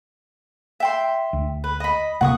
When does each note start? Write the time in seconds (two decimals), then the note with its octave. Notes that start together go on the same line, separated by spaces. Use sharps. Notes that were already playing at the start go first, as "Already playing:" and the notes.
0.80 E5 G5 C6
1.33 D2
1.64 B4
1.80 D#5 B5
2.21 D1 C3 A#3 F#5 C#6 D#6